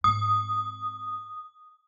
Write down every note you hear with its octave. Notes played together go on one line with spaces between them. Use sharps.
G#2 C4 D#6